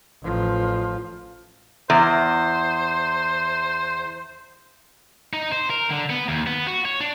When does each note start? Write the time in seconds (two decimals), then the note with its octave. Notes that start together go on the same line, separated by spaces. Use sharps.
0.23 A1 F3
1.90 E2 C5
5.33 D#4
5.52 C5
5.70 A#4
5.90 D3
6.10 B3
6.28 D#2
6.47 B3
6.68 F#4
6.85 C#5
7.00 D4